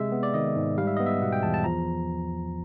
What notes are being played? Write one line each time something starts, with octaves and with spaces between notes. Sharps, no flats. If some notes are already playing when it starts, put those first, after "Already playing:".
Already playing: C3 G#3 E5
B3
D5
D#3 D#5
G#2
G3 F5
E5
B3 D#5
E5
B2 F#5
G5
E2 A5
A5
F3 A#5